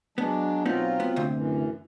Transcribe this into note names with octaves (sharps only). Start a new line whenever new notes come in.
F#3 G#3 B3 D4
B2 F#3 B3 C4 D#4 F4
B3
D2 C3
F#2 E3